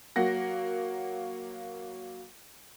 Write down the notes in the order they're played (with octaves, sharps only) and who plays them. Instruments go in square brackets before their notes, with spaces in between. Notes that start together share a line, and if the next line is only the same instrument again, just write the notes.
[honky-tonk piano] F#3 A#3 F#5 A#6